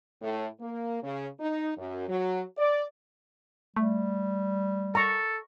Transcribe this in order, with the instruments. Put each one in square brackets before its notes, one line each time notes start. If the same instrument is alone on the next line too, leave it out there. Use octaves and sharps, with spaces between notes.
[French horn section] A2
A#3
C#3
D#4
F#2
F#3
D5
[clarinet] G3 [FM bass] A3
[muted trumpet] A4 [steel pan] A#5 C#6